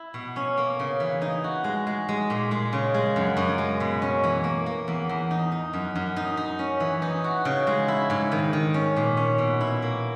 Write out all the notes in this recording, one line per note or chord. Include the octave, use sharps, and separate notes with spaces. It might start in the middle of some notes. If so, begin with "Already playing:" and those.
Already playing: E4
B2
C#4
A#3
C#3
E3
D#4
F#4
G#3
G#3
G#3
A#2
G#3
C#3
G#3
F#2
F#2
G#3
B2
C#4
E3
A#3
A#3
E2
E2
D#4
D#4
F#2
F#2
D#4
D#4
C#4
E3
D#4
F#4
C#3
G#3
E4
G#2
D#3
D#3
C#4
A#2
C#4
B2
E4
A#3